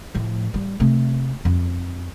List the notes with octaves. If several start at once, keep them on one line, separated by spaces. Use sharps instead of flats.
A2 F3
G3
C3 A3
F2